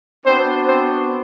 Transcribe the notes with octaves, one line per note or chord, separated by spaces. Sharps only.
B3 C4 D4 F#4 C5
C4 C5